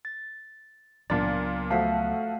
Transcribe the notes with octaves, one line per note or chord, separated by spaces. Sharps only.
A6
C#2 A#2 F#3 B3 D4 A6
F3 A3 F#4 A4 F5 B6